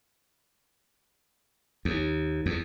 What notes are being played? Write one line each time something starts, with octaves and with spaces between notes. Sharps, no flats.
D#2
E2